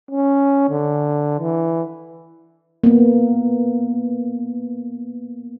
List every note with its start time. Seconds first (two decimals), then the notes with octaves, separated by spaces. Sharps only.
0.11 C#4
0.70 D3
1.40 E3
2.84 A#3 B3